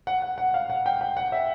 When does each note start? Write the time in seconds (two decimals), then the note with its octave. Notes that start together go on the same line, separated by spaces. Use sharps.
0.07 F#5
0.22 F#5
0.38 F#5
0.54 F5
0.70 F#5
0.86 G5
1.01 G5
1.17 F#5
1.32 E5